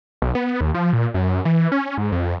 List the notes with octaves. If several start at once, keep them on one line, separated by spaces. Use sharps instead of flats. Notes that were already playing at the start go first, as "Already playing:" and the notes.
B1
B3
D#2
F3
A#2
F#2
E3
C#4
G#2
F2